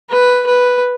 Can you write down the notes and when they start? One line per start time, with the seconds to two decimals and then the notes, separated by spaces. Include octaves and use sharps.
0.10 B4
0.47 B4